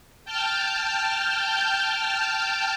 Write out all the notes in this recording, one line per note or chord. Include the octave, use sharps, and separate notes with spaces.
G5 A5 F6 G6